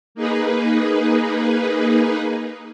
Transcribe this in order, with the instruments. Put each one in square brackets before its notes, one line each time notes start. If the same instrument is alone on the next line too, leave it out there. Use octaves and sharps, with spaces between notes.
[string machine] A#3 D#4 G#4 B4